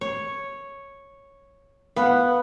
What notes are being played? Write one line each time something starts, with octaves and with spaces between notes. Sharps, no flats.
C#5
B3 F5 F#5